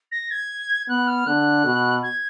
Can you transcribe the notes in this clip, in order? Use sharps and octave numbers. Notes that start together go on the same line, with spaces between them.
A#6
G#6
B3 F#6
F6
D3 F#6
B2
G#6